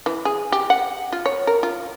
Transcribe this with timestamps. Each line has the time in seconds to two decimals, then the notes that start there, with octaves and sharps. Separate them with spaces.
0.06 E3
0.25 G#4
0.52 G4
0.70 F#5
1.13 F4
1.26 C#5
1.47 A#4
1.63 F4